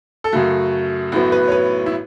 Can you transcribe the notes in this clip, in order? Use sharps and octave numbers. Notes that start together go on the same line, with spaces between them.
A4
F#2 C#3 A3 F#4
A1 A2 F#3 B3 F#4
B4
C#5
B4
E4